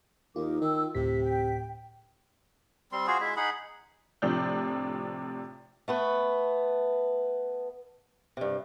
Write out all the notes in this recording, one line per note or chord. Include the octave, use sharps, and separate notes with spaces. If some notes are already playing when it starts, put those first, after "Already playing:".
D#2 D#4 F4 A#4 D6
D#3 G5 E6
D2 A2 C3 E5 B6
G5
G3 C4 C6
F4 F#4 G#4 C5
G#3 E4 E5
D#4 G#4 F#5 B5
A2 C3 F3 D4 G6
A3 B3 B4
G2 C3